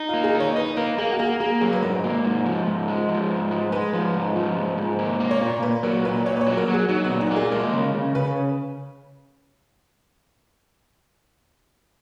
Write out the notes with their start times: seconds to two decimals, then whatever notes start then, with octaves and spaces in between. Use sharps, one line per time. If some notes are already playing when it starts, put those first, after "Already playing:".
Already playing: D#4
0.09 A#3 F4
0.24 G#4
0.35 D#4
0.40 C#5
0.56 D#4 B4
0.76 A#3 A#4
0.98 A#3 G#4
1.12 F#4
1.19 A#3 G#4
1.40 A#3 G#4
1.61 F#3 G#4
1.73 B4
1.82 G#2 A#4
2.04 A#3
2.25 G#2
2.45 F3
2.67 G#2
2.88 G#3
3.09 F3
3.30 G#2
3.51 G#3
3.72 G#3 B4
3.93 F3
4.14 G#2
4.35 F3
4.57 G#2
4.78 G#2
4.99 A#3
5.20 A#3
5.31 C#5
5.41 A#2
5.62 A#2 B4
5.83 F#3 A#4
6.05 A#2 B4
6.26 A#3 C#5
6.37 B4
6.41 C#5
6.47 F#3
6.57 A#4
6.68 F#3
6.74 G#4
6.89 F#3 D#4
7.05 B3
7.10 A#2
7.21 D#4
7.31 A#3
7.36 G#4
7.52 G#3 A#4
7.73 C#3
7.94 C#3
8.15 C#3 B4